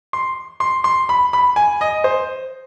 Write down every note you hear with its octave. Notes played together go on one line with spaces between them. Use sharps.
C6
C6
C6
B5
B5
G#5
D#5
C5